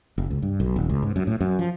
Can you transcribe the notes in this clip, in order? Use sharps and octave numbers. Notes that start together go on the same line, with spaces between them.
F#1
C#2
G2
B1
D#1
C#2
G#2
F#2
A2
F#2
F3